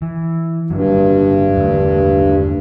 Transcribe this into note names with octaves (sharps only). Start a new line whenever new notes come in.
E3
G1 G2 F#3
E2 D3 A3